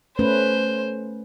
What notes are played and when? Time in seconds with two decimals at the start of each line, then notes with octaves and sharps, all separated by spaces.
0.19 A3 C#4 B4 C5